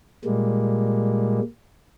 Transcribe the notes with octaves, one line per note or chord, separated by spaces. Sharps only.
A#2 G3 G#3 A#3